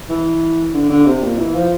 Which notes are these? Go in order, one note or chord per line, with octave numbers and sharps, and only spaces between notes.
E3
D3
D3
C3
A#2
E3
F3